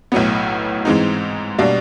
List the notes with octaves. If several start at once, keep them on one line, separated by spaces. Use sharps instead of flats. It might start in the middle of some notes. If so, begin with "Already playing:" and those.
B1 A2 F#3 B3
G#2 E3 G#3 C4 D#4
B2 G3 A#3 D4